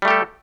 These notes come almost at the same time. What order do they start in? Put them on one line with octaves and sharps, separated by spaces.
G3 A3 G4 A4